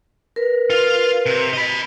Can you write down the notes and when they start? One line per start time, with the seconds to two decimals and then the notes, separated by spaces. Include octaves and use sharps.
0.36 A#4 B4
0.70 F4
1.26 C3
1.53 D#5 B5